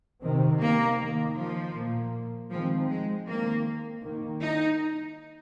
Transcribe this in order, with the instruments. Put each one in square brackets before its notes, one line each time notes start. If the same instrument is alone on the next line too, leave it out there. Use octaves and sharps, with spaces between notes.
[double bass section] C3 D#3 C4
[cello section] A#3
[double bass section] D#3 A#3
[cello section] F3
[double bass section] A#2 A#3
[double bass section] D#3 G#3 C4 [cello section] F3
[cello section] G#3
[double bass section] D#3 C4 [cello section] A#3
[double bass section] D#3 A#3
[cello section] D#4